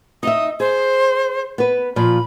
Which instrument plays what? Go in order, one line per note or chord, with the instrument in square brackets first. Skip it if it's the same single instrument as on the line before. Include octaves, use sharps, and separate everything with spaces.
[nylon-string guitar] D#4 D#5 E5 [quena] D#6
[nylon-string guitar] G#4 [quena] C5
[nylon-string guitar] B3 B4
[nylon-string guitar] A#2 F3 [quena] B5